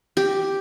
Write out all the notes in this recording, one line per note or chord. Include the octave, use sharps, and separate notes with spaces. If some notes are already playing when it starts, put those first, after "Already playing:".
G4